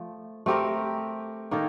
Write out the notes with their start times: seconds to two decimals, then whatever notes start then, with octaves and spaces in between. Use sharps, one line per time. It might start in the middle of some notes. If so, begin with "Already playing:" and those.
Already playing: F3 A3
0.46 A3 C4 G4 A#4
1.51 D#3 A#3 D#4 A4